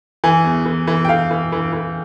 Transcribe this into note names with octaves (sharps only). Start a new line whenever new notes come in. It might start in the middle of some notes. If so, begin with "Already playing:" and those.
E3 G#5
E2
E3
E3
G5
E3 F5
E3
E3
E3